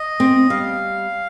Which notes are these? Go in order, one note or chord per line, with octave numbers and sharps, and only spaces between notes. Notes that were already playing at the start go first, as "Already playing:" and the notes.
Already playing: D#5
C4
G3 F5